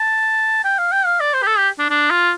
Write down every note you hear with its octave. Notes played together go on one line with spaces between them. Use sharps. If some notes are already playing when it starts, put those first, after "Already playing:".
Already playing: A5
G5
F5
G5
F5
D5
C5
G4
A4
G4
D4
D4
F4